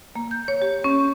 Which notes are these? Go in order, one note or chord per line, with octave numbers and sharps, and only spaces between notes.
A#3
G6
C#5
G4
C#4